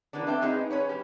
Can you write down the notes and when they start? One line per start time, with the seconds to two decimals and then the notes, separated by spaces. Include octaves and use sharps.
0.13 E3 A#3 B3 D4
0.27 A3 C4 D4 D5 E5 G5
0.41 G#3 B3 C4 D#4 G#4
0.70 C#4 B4 C#5
0.89 G3 C#4 G4